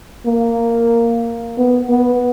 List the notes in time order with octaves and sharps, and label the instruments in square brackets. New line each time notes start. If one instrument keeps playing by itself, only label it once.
[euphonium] A#3
B3
B3